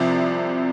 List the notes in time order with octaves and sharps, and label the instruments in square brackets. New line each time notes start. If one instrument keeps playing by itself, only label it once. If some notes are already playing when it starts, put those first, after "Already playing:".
Already playing: [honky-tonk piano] C2 C3 F3 D5